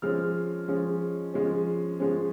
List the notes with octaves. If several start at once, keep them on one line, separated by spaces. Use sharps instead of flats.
F3 G#3 C#4 F6
F3 G#3 C#4
F3 G#3 C#4
F3 G#3 C#4